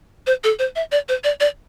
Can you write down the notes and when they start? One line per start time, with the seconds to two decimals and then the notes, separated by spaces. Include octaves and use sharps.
0.27 C5
0.44 A4
0.59 C5
0.76 E5
0.92 D5
1.09 C5
1.24 D5
1.40 D5